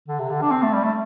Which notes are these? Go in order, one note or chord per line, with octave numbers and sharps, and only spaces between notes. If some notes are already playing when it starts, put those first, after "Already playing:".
D3
C3
D3
D4
C4
A3
G3
A3